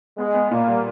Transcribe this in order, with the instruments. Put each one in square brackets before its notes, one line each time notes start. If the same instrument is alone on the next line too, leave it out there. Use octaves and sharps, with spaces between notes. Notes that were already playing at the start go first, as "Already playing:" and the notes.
[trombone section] G#3 [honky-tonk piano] B3
[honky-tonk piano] B3
[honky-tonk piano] A#2 [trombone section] A#3
[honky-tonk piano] G3